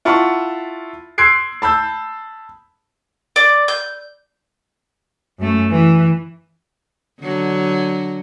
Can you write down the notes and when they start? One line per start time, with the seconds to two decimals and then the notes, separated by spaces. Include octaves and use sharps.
0.05 E4 F4 F#5 A5 B5 C#6
1.18 C6 E6 F#6 G#6 C7 D7
1.62 A5 B5 E6 G6
3.36 D5
3.68 G6
5.39 F#2 A3
5.71 E3
7.21 D3 F#3